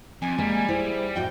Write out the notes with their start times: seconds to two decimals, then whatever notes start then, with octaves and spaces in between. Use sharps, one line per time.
0.22 F2 G#5
0.38 G3 G#3 A#3
0.68 E4 G#4 C5
1.16 A2 F#4 D#5 G5